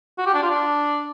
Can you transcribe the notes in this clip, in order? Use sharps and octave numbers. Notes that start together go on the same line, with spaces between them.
F#4
G4
D4
F4
D4